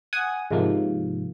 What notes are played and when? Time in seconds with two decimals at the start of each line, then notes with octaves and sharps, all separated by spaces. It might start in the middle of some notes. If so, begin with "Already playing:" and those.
0.13 F#5 G#5 D#6
0.51 G#2 C3 F3 A#3